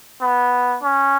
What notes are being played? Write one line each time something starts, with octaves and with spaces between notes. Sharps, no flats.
B3
C#4